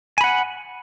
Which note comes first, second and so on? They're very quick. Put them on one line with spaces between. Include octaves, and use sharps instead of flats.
G#5 B5 F#5